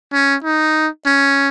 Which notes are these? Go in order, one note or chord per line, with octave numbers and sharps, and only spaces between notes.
C#4
D#4
C#4